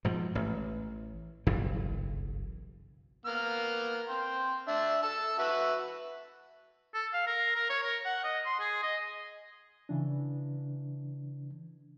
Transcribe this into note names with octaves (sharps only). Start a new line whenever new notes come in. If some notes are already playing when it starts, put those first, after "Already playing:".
G#2 B2 F3
A1
F#1 B1 G2 E3
A#3 B3 F6
G5 C6
D4 E5
A5 E6
F#4 B4 E5
A4
F5
A#4
A#4
C#5
A#4
F#5
D#5
C6
G#4
D#5
C#3 E3 D4